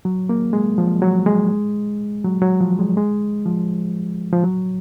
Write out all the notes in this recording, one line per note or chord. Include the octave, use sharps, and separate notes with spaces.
F#3
A#3
G#3
F3
F#3
G#3
F#3
F#3
F3
G#3
G#3
F3
F3
F#3